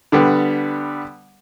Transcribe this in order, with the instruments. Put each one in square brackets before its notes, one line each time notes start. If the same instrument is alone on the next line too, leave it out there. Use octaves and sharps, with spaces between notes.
[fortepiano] D3 G3 B3